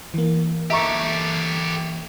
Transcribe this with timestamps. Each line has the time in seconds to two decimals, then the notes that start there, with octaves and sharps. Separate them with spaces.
0.14 E3 A#3
0.70 G4 A4 E5 A#5 C#6